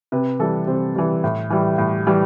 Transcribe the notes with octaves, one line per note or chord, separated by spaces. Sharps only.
C3 B4
E3 G3 A4
C3 C5
E3 G3
A2
E3 G3
A2
E3 G3